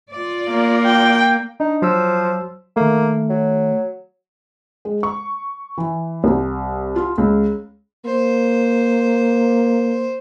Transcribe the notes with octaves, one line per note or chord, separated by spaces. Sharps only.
F4 D5
A#3
G5
D4 D#4
F3 F#3 E6
D#3 A3 A#3
F#3
G#3
C#6
E3
C2
F4
C#2
A#3 C5